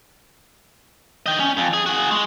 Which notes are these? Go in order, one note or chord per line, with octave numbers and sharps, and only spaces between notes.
D#5 G5
C#4
F2
G#4
F#4 G#4
G#3